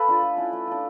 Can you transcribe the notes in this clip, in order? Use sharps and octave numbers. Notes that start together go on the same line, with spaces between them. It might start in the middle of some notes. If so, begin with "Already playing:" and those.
Already playing: A4 B4 F5
D4 F4
A3
C#4 E4
A3
D4 F4